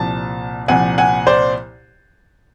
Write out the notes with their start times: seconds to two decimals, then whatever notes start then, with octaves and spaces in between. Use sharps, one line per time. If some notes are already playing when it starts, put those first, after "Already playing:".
Already playing: C2 A#2 F3 A5
0.68 C2 A#2 F3 F#5 G#5
0.98 F#5 G#5
1.27 C5 D5